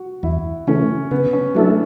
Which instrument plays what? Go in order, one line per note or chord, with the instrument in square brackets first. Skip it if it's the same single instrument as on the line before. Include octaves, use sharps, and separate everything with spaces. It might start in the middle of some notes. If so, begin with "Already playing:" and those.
Already playing: [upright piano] F#4
[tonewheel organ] E2 [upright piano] E4
[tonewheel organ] C#3 E3 A3 [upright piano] C#4
[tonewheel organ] C#3 [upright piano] B3
[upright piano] C#4
[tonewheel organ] F#3 A3 E4 A4 [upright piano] D4